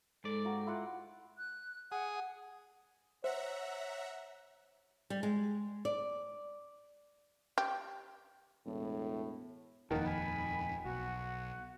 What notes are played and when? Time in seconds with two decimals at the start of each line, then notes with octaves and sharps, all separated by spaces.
0.24 G#2 G#3 A4 D5
0.45 A#3 F#4 G5
0.67 E4 F4 F#5
1.38 F#6
1.92 G#4 F#5
3.24 C5 C#5 E5 F#5 A#5
5.10 G3
5.23 G#3
5.85 D5
7.58 G4
8.66 E1 A2
9.91 D#1 F2 D#3 A#3 B4 F#5 A5
10.06 G#5 B5
10.85 B1 F#4 F#5